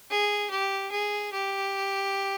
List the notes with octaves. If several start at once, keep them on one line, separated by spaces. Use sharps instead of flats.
G#4
G4
G#4
G4